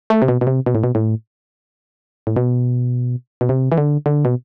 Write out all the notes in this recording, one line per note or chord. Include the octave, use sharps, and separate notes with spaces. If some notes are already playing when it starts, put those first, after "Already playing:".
A3
C3
B2
B2
C3
B2
A2
B2
A2
A2
B2
B2
C3
E3
D3
D3
B2